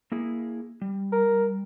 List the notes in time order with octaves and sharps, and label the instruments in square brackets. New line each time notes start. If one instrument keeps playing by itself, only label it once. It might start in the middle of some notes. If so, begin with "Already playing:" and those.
[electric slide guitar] A#3 E4 G#4
G3
[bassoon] A#4